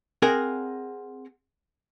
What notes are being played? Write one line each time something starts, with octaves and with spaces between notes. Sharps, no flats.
C4 G#4 A#4 D#5 F#5